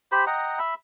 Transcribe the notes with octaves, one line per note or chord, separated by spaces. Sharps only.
G4 C5 B5
D#5 F#5 G5 A#5
E5 B5